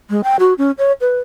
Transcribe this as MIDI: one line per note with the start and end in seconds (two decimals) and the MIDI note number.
0.10 0.21 56
0.24 0.36 79
0.39 0.53 66
0.58 0.71 61
0.78 0.92 73
1.01 1.18 71